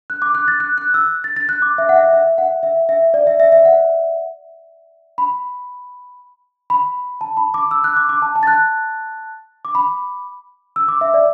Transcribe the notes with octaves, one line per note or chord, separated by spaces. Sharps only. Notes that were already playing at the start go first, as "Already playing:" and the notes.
F#6
D6
F#6
A6
F#6
F#6
E6
A6
A6
F#6
D6
E5
F#5
E5
E5
F#5
E5
E5
D5
E5
E5
E5
F#5
B5
B5
A5
B5
D6
E6
F#6
D6
D6
A5
A5
A6
F#6
D6
B5
E6
D6
E5
D5